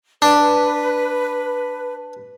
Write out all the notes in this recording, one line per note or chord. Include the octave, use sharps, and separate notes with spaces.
D4 B4